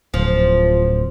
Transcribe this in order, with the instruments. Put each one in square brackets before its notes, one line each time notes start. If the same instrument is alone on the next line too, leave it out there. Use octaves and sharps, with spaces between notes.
[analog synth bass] D1 [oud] F3